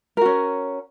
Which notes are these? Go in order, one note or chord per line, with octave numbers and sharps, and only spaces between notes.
C#4 F#4 A#4